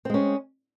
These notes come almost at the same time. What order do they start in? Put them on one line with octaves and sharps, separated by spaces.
C4 G#3 C#4